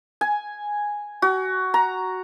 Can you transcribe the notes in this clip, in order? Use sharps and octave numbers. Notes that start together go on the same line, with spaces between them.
G#5
F#4
A#5